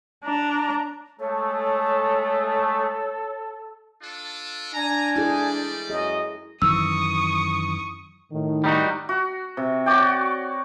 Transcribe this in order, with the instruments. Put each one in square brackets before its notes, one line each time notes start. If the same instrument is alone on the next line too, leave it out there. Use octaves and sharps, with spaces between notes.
[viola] D4 A#5
[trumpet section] G#3 A3 [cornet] A4 [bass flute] C#5
[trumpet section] D4 F4 A4
[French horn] D4 [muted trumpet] G#5 [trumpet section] A#5
[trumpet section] G3 C5 D5 [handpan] E4 G#4 A4
[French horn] F#2 [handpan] G#4 [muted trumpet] D#5
[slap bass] F#2 D#3 E3 [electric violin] C#6 D#6 [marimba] E6
[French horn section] A2 D#3
[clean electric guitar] G3 D#4 F#4
[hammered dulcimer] F#4
C3
F#4 C#5 D5 G5